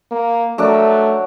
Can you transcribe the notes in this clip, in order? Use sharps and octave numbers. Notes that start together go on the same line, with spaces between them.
A#3
F#3 A3 D4 A#4